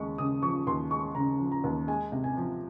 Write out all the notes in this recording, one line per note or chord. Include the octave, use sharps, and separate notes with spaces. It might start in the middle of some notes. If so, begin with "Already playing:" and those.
Already playing: D#2 C#3 G#3 C#6
C#3 D#6
F3 C#6
D#2 C6
G#3 C#6
C#3 A#5
F3
A#5
D#2
G#3 G#5
C3
G#5
F3